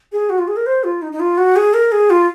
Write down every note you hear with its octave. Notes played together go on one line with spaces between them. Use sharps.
G#4
F#4
F4
G#4
A#4
C5
F4
D#4
D#4
F4
F#4
G#4
A#4
G#4
F4